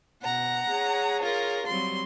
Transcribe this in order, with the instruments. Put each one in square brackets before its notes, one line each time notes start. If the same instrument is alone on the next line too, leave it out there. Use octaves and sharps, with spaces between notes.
[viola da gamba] B2 [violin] F#5 A#5
[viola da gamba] G#4 C#5
[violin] F4 A#4
[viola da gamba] F#3 G3 C4 [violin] C6